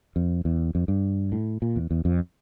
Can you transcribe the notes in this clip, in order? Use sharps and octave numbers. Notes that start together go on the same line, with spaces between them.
F2
E2
F2
G2
A2
A#2
E2
E2
F2